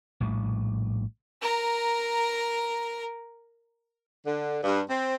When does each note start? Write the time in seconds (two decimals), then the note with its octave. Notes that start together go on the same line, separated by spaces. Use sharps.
0.20 A#1 A2 G3
1.42 A#4 A#5
4.25 D3
4.63 G2
4.90 C4